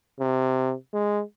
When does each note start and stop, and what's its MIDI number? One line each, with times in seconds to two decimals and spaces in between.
0.20 0.74 48
0.94 1.23 56